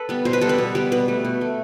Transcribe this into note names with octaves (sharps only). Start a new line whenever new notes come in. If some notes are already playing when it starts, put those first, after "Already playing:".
Already playing: A4 B4
G3 B3
B2 C5
B4
G3 B3 A4
B4
B2
G3 B3
B2 B4
A3
B2
A3